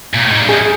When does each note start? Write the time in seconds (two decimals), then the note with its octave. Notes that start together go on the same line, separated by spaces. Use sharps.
0.14 A#2
0.23 A2
0.32 G#2
0.40 G2
0.49 F#2 G#4 G#5